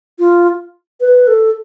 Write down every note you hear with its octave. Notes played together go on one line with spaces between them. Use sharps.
F4
B4
A4